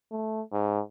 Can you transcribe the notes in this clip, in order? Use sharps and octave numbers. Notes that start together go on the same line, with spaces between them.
A3
G#2